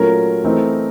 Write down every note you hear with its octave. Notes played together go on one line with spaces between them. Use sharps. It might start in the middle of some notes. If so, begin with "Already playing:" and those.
Already playing: A#2 F#3 A3 C#4 A#4
E3 A3 C4 D#4